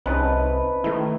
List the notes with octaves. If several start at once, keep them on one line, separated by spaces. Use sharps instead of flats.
C2 C4 C#4 D#4 B4 C5 D#5 A5
D#3 A3 E4